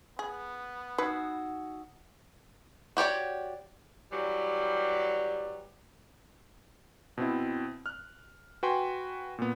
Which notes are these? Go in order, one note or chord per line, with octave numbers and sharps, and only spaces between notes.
B3 G#4
D#4 F#4 B4 D#6 E6
F#4 G4 C#5 D5
E3 F#3 G3
B2 C4 E4
F6 F#6
F#4 B4 G5 G#5 C6
A#2 B3